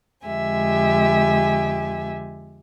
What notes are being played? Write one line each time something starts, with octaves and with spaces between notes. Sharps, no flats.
F2 D3 G#3 G4 E5 G#5